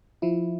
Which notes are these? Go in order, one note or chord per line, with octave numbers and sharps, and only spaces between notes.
F3 E4